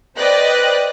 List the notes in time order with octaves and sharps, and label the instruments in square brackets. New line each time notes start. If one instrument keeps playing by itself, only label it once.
[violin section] B4 C5 D5 D#5 G5 F#6